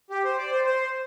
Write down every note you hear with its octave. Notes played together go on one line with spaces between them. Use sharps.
G4
C5
D5
C5
C5